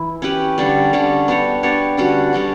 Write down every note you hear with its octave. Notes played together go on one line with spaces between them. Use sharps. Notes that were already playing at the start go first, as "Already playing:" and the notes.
Already playing: E3 E4
C#4 G4 B4
D3 G3 C#4
D3 G3 C#4
B3 D4 G4 C#5
B3 D4 G4 C#5
D3 G3 C#4 F#4
D3 G3 C#4 F#4